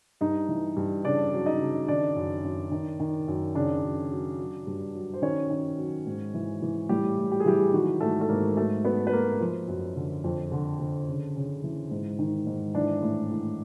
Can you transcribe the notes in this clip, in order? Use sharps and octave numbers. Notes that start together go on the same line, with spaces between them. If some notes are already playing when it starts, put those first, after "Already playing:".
G2 D#4 D#5
E3
G2
C#3 D4 D5
F#3
D#4 D#5
C#3
D#3 D4 D5
F#2
F#2
D#3
D#3
F#2
C#3 D4 D5
F#2
F#3
F#3
G2
F#3
C5
D#3 C#4 C#5
D#3
F#3
G#2
E3
E3
A2 G3 G4
A2
G4
G#4
E3 G3 G4
D#3 F#3 F#4
G#2 A3 A4
A4
G#2 A#3 A#4
F#3 A3 A4
F#3 B3 B4
B4
F#3 A#3 A#4
F3
F#2
D3
F2
D3
D3
C#3
C#3
E3
G#2
D#3
G#2
E3 D4 D5
A2
A2